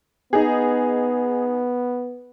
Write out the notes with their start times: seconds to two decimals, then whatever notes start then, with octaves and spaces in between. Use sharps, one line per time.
0.33 B3 D#4 G#4